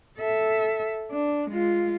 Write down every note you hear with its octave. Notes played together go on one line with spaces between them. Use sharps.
A4 E5
D4
G#3 F4